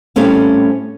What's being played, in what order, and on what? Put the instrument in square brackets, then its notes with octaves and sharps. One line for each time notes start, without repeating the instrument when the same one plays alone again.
[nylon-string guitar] A2 G3 A3 C4 C#4 F5